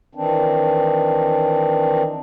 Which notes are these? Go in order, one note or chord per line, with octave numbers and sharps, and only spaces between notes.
D#3 E3 C4 D4